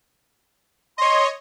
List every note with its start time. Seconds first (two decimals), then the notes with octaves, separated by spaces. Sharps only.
0.98 C#5 D#5 C6